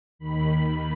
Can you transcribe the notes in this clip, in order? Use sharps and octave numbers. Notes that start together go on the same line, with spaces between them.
D#2 D#3 B5